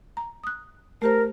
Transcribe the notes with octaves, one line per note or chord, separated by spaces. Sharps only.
A#5
D#6 F#6
A3 G4 A#4 C5